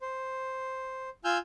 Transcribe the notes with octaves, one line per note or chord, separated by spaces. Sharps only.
C5
F4 G#5 E6 F6 G6